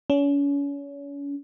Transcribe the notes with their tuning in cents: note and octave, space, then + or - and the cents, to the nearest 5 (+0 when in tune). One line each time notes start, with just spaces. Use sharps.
C#4 +35